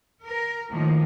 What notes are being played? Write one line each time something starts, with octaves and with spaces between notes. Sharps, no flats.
A#4
A2 D#3 F3 A#3